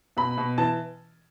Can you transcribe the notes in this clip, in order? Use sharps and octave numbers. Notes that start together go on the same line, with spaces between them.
B2 B5
B2
E3 A5